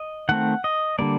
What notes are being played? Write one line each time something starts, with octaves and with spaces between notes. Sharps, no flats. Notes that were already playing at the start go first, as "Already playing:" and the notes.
Already playing: D#5
D#3 A3 C4 F#5
D#5
D3 G3 A#3 D5